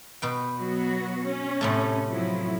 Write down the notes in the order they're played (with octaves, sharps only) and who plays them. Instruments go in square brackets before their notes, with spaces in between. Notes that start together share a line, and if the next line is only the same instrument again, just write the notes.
[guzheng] B2 B4 G5
[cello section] F#3 B3 F#4
C#4
[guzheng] A2 C3 A3
[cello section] F3 F#3 E4